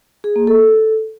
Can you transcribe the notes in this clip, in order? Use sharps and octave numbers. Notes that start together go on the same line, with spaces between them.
G#4
A#3
A4